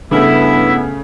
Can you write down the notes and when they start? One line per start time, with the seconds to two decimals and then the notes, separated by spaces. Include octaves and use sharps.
0.11 G2 C#3 A3 B3 E4 E5